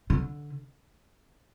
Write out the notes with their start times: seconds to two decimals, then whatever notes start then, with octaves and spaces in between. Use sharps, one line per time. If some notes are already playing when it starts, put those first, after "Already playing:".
0.10 D3